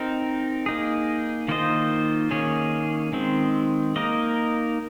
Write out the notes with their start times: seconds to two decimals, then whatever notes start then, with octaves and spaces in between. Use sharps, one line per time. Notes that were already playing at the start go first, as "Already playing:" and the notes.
Already playing: C4 D#4 A#4
0.66 A#3 D#4 G#4
1.48 D#3 A#3 F4 C5 D#5
2.31 D#3 A#3 C#4 G#4 C#5
3.13 D#3 G#3 C4
3.96 A#3 D#4 A#4 D#5